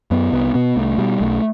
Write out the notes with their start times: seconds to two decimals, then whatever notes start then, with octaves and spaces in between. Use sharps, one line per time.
0.11 F#2 B3
0.32 C2 B3
0.54 B2 B3
0.76 C2 A3
0.98 B2 G3
1.21 B1 A3